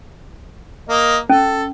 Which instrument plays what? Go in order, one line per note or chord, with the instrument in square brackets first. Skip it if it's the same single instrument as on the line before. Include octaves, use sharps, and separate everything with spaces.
[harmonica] A#3 D#5
[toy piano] C#4 [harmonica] A4